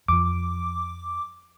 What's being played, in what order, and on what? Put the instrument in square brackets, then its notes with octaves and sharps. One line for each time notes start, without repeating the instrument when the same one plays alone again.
[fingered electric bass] F2 F3 [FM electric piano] D6